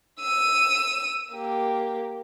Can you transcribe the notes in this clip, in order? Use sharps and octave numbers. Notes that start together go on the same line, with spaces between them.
E6 D#7
A#3 G4